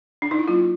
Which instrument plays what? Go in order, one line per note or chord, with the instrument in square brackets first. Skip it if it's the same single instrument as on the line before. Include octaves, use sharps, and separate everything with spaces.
[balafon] D4
D#4
E4
F#3 A#3 C#4 F4